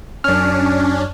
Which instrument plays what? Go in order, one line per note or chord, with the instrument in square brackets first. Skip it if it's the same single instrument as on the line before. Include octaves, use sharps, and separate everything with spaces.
[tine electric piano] F#2 F6 [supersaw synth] C#4 D4